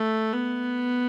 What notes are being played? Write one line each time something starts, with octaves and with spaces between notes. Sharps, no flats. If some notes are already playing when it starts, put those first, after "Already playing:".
Already playing: A3
B3